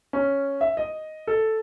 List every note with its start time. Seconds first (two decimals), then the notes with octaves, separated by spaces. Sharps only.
0.13 C#4
0.61 E5
0.77 D#5
1.27 A4